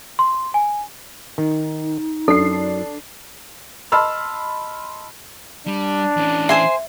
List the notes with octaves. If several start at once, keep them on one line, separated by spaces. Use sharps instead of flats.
C6
G#5
D#3 D#4
F#2 D4 A4 C7
D#5 A5 B5 C6 E6 F6
G3 D4
E3 C#4
C5 E5 G#5 C6